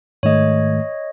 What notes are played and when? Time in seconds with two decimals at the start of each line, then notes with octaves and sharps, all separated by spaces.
0.23 G#2 D#3 A3 C#5 D#5